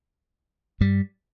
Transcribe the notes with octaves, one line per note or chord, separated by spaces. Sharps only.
G2 G3